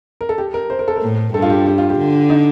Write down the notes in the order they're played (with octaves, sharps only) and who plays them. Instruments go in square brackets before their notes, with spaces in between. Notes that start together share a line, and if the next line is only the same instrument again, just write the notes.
[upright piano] A#4
A4
G4
A#4
C5
A#4
A4
A#4
[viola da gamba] A2
[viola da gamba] G2 [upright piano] A4
[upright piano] F4
G4
G4
F4
G4
[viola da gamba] D3
[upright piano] D#4